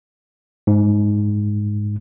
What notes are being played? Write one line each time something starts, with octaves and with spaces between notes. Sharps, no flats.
G#2